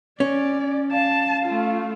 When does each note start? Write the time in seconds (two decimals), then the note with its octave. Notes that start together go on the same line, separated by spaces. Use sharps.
0.20 C#4 D5
0.92 F5 A5
1.45 A3 F4